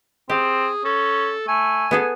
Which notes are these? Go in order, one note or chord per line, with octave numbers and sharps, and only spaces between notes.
C4 G4 G#4
C#4 A4
A3 G#5
B3 G#4 A4